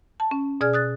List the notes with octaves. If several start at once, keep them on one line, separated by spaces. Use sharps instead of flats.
A5
C#4
B2 G#4 D5 G#5 F6 G#6
D#6 F#6 A6